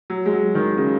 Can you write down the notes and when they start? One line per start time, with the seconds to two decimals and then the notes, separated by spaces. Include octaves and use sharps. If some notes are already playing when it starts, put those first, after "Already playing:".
0.10 F#3
0.26 G#3
0.33 F#3
0.55 D#3
0.77 C#3